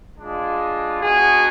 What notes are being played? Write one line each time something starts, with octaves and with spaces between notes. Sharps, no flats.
G#3 D4 F4
G#3 B3 D4 F#4 G#4